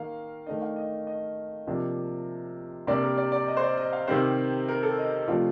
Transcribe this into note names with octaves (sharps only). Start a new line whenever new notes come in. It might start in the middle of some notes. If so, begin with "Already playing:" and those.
Already playing: D#3 A#3 F5
D#3 A3 D4 D#5
F5
D#5
D#5
C3 F3 A#3 D4
C3 G3 A#3 D4 D5
A#4
D5
D5
D#5
C5
D5
D#5
F5
C3 D#3 G3 C4 C5
A#4
A4
D#5
C3 F3 A3 D4 F4